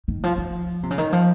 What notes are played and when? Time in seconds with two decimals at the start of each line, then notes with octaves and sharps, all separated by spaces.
0.08 D#3
0.24 F3
0.38 F3
0.83 C3
0.91 C#3
0.98 D#3
1.13 F3